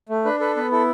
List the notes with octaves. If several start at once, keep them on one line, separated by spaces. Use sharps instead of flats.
A3
D4 B4
A4 B4
B3 B4
E4 A4